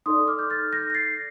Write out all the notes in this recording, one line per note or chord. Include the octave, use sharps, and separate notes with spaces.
D#4 A4 D5 C6 D#6
D6 F6
G6
F6 A6
G6 A#6
A#6
A6 C7